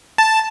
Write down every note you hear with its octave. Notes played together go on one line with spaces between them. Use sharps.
A5